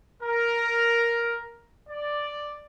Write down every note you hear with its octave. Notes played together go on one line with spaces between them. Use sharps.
A#4
D5